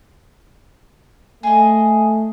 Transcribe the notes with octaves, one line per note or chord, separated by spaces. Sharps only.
A3 G#4 D#5